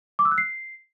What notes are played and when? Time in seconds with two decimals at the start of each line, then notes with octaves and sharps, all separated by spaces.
0.19 D6
0.25 E6
0.31 F#6
0.38 C7